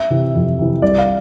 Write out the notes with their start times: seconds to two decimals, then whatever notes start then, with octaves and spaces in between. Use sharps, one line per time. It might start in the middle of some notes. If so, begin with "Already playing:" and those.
Already playing: E5
0.10 C3 E3
0.35 F2
0.59 C3 E3
0.82 C2 D5
0.98 F5